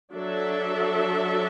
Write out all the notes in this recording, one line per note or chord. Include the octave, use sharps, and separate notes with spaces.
F#3 D4 A4 E5